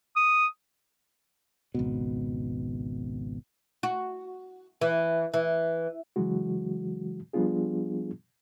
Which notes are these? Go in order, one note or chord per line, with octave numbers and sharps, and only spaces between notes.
D#6
G#1 C#2 B2
F#4
E3
E3
C#3 E3 F#3 G#3 F#4
F3 G3 B3 D4 F4 G#4